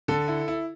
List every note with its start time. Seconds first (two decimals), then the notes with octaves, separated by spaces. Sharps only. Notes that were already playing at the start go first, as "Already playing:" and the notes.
0.08 D3 A4
0.28 E4
0.48 E4